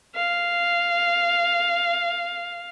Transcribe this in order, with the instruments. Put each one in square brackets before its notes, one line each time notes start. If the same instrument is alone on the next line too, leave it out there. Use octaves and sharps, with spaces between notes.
[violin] F5